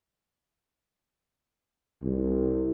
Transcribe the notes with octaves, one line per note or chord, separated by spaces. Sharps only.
C2